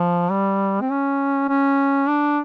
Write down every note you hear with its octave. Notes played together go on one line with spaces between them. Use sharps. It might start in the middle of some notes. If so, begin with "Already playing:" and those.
Already playing: F3
G3
C4
C#4
C#4
D4